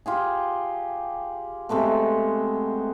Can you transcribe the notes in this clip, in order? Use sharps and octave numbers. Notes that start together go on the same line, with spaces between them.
F4 G4 G#4
C3 G#3 A3 B3